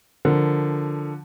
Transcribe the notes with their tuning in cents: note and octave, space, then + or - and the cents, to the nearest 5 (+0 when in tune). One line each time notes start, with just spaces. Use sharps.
D3 +0 F3 +0 A#4 +0